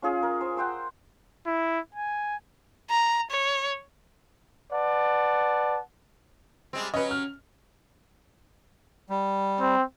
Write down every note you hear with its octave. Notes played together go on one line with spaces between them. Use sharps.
C#4 F4 G#4 F5
A#4
C5 G#5
F#5 G5 C6 E6
E4
G#5
A#5
C#5
B4 D5 F#5 A5
G3 G#3 C4
F#3 C#4 B4 D#5
F6
G3
C4